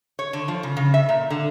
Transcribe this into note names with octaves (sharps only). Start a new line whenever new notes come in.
C#5
D3
F3
C#3
C#3
E5
A#2
D3